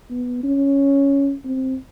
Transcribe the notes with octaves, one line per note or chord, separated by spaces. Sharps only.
B3
C#4
C4